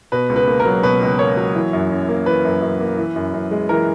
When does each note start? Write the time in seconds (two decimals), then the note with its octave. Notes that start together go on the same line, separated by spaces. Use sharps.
0.12 B2 B4
0.30 C#2
0.36 B4
0.48 A#3
0.60 A#4
0.66 F#3
0.83 B2 B4
1.01 C#2
1.19 A#3 C#5
1.37 F#3
1.55 E3
1.73 F#2
1.91 F#2
2.09 A#3
2.26 E3 B4
2.44 F#2
2.62 F#2
2.80 A#3
2.98 E3
3.16 F#2
3.34 F#2
3.51 G#3
3.69 E3 A#4